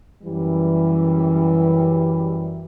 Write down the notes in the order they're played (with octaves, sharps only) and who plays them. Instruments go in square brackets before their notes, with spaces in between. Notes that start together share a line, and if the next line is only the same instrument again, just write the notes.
[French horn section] F#2 E3 G3